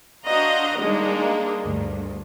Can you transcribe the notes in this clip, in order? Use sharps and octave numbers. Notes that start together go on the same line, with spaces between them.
D4 F#4 C5 D#5 F5 A#5
D#3 G3 G#3 A#3 D4 D#4
D2 G2